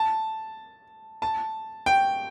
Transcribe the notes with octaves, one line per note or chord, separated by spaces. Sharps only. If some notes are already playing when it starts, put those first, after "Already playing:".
Already playing: A5
A5
G5